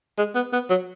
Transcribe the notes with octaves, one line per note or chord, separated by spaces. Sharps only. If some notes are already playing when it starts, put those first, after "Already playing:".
G#3
B3
B3
F#3